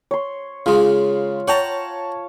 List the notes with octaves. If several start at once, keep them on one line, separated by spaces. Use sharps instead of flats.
C#5 C6
C#3 G#3 F4
C#5 F#5 G5 A5 A#5